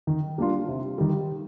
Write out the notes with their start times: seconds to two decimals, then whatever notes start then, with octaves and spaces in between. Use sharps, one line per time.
0.07 D#3
0.38 G3 A#3 D4 F4
0.68 C3
0.98 D#3 G3